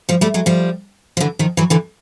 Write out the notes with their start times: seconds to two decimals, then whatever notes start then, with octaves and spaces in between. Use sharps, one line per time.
0.09 F3 G3
0.21 G3 A3
0.34 F#3 G#3
0.46 F3 G3
1.17 F3
1.20 D3 E3
1.39 D#3 F3
1.57 E3 F#3
1.70 D3 E3